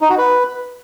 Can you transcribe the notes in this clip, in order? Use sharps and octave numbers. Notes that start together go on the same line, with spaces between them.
D#4
F#4
B4